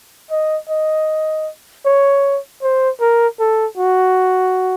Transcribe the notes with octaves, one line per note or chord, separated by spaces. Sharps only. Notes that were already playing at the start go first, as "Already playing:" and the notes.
D#5
D#5
C#5
C5
A#4
A4
F#4